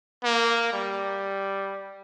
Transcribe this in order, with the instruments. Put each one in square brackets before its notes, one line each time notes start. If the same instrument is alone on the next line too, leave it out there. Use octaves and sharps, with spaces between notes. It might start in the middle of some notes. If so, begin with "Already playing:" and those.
[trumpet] A#3
G3